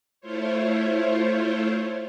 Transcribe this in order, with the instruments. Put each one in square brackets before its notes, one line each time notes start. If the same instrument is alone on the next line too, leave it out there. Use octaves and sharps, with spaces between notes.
[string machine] A3 E4 F4 C5 C#5